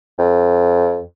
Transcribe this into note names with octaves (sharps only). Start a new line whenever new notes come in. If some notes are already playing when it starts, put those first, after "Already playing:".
F2